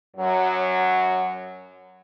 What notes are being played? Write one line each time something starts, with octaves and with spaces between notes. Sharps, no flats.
F#2 F#3